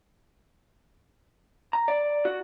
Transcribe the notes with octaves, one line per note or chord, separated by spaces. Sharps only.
A#5
D5
F#4